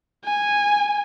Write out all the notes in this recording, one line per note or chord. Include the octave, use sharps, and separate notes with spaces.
G#5